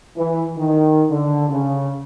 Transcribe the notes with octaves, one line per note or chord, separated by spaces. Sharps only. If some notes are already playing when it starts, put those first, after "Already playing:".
E3
D#3
D3
C#3